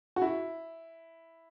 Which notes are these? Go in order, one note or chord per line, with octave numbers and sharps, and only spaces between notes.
F#4
E4